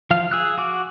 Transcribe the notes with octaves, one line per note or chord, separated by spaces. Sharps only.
F3 F5 F6
G#4 E6 F#6
F#4 D6